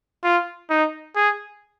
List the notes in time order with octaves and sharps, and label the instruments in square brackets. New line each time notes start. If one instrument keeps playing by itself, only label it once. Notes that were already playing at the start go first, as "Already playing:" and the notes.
[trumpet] F4
D#4
G#4